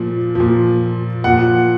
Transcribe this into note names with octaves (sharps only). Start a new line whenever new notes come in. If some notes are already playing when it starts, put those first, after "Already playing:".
Already playing: A#2 F3
A#2 F3
A#2 F3 F#5